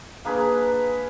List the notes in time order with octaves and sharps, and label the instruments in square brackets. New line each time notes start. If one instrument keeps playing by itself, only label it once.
[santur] A#3 D4 G#4 B4